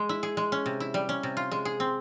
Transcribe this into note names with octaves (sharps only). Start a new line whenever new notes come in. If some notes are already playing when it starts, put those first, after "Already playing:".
Already playing: G#3
E4
G#4
G#3
C#4
C3
E4
G3
C#4
C3
F4
G#3
G#4
C4